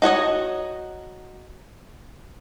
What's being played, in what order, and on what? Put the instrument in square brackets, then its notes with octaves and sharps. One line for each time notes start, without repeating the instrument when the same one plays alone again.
[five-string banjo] D#4 F#4 C#5 D#5